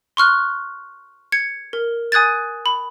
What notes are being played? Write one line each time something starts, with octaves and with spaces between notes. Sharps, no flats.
C6 C#6 F6 F#6
G#6 C#7
A#4
G#5 D#6 F#6 G#6 A6
B5